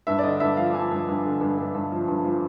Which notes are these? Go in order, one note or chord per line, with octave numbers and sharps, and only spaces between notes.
G2 E5
D5
D3 D#5
G2 E5
F3 F5
F3 G#5
G2
G2
D3
G2
G2
G2
F3
G2
F3